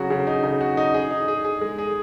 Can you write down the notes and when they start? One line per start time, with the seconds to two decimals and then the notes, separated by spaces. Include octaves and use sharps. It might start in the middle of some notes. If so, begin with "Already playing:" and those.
Already playing: C#3 F#3 F#4
0.10 C#3
0.27 D#4
0.44 C#3
0.61 F#4
0.77 D#4
0.94 G#4
1.11 D#4
1.28 G#4
1.44 G#4
1.61 G#3
1.78 G#4